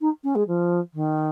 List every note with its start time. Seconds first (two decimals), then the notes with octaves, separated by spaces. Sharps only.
0.01 D#4
0.24 C#4
0.35 G#3
0.48 F3
0.94 D#3